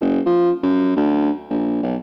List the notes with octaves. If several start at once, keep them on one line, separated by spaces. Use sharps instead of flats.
F#1
F3
F#2
D2
A#1
B1